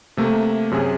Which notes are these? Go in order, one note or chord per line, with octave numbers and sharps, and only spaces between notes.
C3 A3 A#3
F#2 C3 C#4 G#4